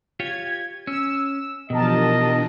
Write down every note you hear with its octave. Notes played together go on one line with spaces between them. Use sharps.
F4 G4 C#5 G#6
C#4 E6
B2 E3 F3 D4 G4 A#4 D#5 A5